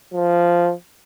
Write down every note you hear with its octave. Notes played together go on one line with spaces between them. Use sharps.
F3